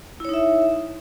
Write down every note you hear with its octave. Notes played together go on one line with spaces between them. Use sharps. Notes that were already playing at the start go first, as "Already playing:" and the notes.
D#4 E4 C#5 E5